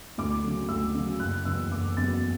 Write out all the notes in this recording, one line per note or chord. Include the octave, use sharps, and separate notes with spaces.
D2 D6
C#3 F#3
D2 E6
C#3 F#3
F#1 F#6
E2 C#3 F#3 B3 E6
F#1 D6
E2 C#3 F#3 B3 A6